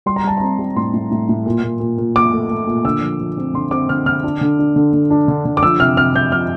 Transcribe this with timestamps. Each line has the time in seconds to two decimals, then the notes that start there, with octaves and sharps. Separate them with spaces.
0.06 G3 C6
0.16 A#5
0.24 G3 A5
0.37 C4 A#5
0.59 G3
0.76 A2 C6
0.94 A2
1.11 A2
1.29 A2
1.46 A#2
1.63 A#2
1.80 A#2
1.98 A#2
2.16 A#2 D6
2.32 A3
2.50 A3
2.67 A#2
2.85 D3 E6
3.02 F3
3.20 F3
3.37 C4
3.54 D3 C6
3.71 C4 D6
3.89 D3 F6
4.06 D3 F6
4.24 D4
4.41 D3
4.59 D4
4.76 D3
4.93 D3
5.10 D4
5.28 D3
5.45 D3
5.57 D6
5.63 F3 E6
5.80 C3 F6
5.97 C3 F6
6.15 C3 G6
6.32 F3 F6